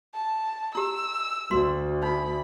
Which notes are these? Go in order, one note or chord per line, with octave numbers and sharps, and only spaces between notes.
A5
E4 G4 E6
D2 F#4 C6
D#4 B5